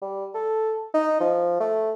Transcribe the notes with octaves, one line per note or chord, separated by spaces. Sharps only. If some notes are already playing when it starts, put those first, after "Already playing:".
G3
A4
D#4
F3
A3